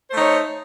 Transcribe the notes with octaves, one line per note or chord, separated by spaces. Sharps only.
A3 D#4 C5 C#5